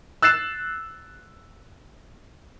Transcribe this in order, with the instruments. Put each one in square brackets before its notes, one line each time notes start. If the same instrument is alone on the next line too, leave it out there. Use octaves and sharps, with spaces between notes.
[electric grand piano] E6 F#6 A6 C7 E7